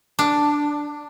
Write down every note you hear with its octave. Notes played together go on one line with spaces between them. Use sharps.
D4